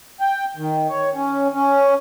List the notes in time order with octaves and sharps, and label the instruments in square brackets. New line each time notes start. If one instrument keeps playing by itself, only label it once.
[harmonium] G5
D#3
C#5
C#4
C#4